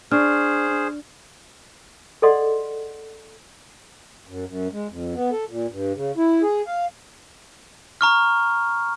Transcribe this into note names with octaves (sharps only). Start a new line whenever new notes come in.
D4 G#4 C5 C#6 F6
G#4 A4 D5 D#5 F#5 C6
F#2
F#2
G#3
F2
B3
A4
A#2
G2
C#3
E4
G#4
F5
A#5 C#6 F6